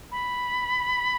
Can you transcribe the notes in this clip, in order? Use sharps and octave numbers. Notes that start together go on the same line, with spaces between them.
B5